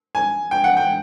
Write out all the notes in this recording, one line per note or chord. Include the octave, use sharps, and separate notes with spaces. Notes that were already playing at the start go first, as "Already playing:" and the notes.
G#5
G5
F#5
G5